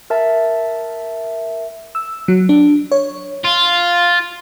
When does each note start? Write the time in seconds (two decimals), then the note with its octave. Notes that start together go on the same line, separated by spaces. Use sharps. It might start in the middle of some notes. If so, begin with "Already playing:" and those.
0.10 A#4 E5 A5
1.95 E6
2.28 F#3
2.49 D4
2.92 C#5
3.44 F4